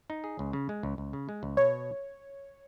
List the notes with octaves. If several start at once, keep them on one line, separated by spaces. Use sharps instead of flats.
D#4
G#4
C#2
C#3
G#3
C#2
C#2
C#3
G#3
C#2
B2 C#5